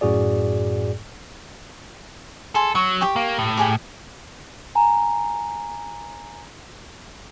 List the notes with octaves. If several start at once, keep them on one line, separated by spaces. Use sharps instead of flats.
F#2 A2 F#4 G#4 D5
G#4 A4 C6
F#3 C#6
G4 G5 C#6
A#3
A2
G4 G#4 G5
G#5 A#5